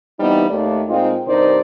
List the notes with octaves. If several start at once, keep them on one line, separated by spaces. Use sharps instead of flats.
E3 G3 B3 C4 D#4
D#2 A3 D5
A#2 G#3 C4 D#4 F4
G2 C3 D#4 A#4 C5 D5